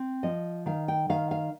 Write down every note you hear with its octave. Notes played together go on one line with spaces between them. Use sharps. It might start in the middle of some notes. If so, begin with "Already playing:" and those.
Already playing: C4
F3 D#5
D#3 F5
G5
D#3 F5
F5